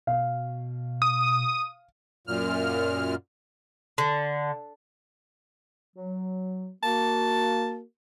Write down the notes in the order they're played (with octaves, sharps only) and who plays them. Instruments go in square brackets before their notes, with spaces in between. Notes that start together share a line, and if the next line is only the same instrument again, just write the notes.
[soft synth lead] B2 [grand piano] F5
[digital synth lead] D#6
[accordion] F#2 A#2 F6
[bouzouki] D3
[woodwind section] F#3
[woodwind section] A#3 F#4 [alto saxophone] A5